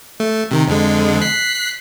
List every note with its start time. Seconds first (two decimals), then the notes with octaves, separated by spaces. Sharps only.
0.20 A3
0.51 C3 D#3
0.68 F2 D3 G#3
1.21 F#6 B6 C7